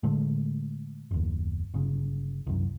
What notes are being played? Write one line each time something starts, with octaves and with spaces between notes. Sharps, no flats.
A2 D3 G#3 A3
F#1 D#2
G1 C#3
C2 F#2